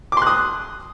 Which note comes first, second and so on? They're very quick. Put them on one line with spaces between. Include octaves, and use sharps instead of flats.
D6 C6 F#6 D#6